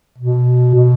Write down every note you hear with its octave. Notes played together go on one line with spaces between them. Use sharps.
B2
B2